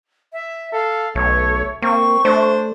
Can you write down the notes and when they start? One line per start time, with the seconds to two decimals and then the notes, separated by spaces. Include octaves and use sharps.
0.33 E5
0.72 A4 F5
1.15 B1 A3 C#5
1.82 A#3 C4 C#6
2.25 A3 D4 C5